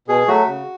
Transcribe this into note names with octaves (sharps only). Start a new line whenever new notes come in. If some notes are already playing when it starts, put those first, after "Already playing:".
B2 G#4
F#3 A3 F#4
C#3